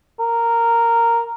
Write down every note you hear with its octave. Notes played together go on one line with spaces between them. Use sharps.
A#4